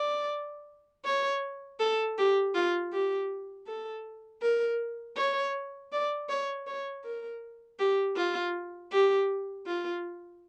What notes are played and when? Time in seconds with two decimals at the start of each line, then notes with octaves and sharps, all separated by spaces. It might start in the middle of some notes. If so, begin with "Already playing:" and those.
Already playing: D5
1.05 C#5
1.80 A4
2.18 G4
2.55 F4
2.92 G4
3.67 A4
4.42 A#4
5.17 C#5
5.92 D5
6.29 C#5
6.67 C#5
7.04 A#4
7.79 G4
8.16 F4
8.92 G4
9.66 F4